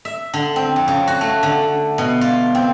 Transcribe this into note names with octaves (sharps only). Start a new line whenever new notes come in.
E5
D3
C4
F2
C#3
F#4
A3
D3
B2
F4
C4